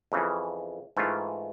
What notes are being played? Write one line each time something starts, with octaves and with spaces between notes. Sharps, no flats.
F2 C#3 E3
G#2 E3 A3 C#4 F4